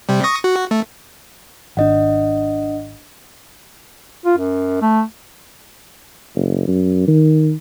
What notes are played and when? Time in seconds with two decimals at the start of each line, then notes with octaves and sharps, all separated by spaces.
0.09 C3 G3
0.24 C#6 D#6 A#6
0.44 F#4
0.71 A3
1.77 G#1 D4 D#5 F#5
4.25 F4
4.37 F#2
4.82 A3
6.36 F#1
6.68 F#2
7.08 D#3